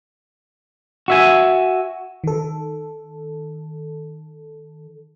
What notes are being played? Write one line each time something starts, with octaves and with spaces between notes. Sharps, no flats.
F#4 E5 G#5
D#3 A4